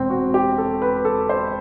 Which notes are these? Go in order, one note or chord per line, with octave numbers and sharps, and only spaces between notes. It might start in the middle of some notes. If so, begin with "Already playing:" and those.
Already playing: E1 C4
F#4
G4
A4
B4
A4
C5